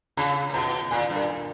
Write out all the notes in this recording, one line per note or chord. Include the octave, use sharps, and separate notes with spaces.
C#3 A#5
A#2
B2 A#5
A#2 G#5
G2
A#4